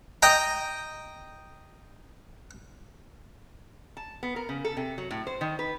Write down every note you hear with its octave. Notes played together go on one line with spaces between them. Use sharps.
D#5 G5 A#5
A5
B3
A#4
C#3
A4
C3
F#3
A2
C5
D#3
B4